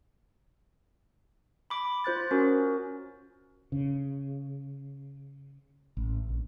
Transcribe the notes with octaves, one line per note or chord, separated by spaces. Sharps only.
B5 D6
F4 C5 F#6 A6
C#4 F#4 A#4
C#3
A1
A#1